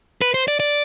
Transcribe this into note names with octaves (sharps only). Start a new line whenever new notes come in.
B4
C5
D5
D5